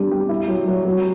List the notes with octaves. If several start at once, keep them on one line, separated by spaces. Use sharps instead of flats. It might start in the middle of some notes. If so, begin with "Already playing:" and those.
Already playing: G3 D4
G4
E4
F#3
F#3
F#3